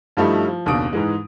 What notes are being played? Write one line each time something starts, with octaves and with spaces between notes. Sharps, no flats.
G2 F3 G3 A3 D#4 E4
F3
F#1 D#2 B2 D4 D#6 D7
G#2 E3 G#3